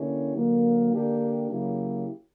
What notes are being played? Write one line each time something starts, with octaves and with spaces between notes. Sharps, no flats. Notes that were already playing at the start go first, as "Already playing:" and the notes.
Already playing: D3 A#3 C#4 E4 G4
D3 F#3 A#3
D3 A#3 D4 G4
C#3 F#3 A#3 E4 G4